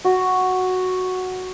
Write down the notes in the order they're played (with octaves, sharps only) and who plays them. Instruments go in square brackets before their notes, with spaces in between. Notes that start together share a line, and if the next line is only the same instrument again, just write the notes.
[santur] F#4